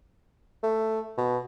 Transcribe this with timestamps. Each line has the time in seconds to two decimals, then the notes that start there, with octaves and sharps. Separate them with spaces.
0.63 A3
1.18 B2